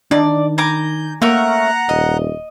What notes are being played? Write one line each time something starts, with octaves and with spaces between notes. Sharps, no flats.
D#3 D4 D#4 D5
G#5 A#5 D6 G6
A3 A#3 C#4 A#4 F#5 A#5
D#1 D#5